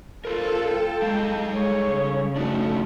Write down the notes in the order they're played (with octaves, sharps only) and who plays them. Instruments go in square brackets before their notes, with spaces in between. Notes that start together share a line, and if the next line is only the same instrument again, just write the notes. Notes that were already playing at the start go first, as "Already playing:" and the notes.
[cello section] F4 A4 [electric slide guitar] A#4 C5
[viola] G5 A5
[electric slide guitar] G3 A4 F5 [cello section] G#3
[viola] G#4 C#5
[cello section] C#3
[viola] F3 A3 [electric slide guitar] D4 D#4 F#4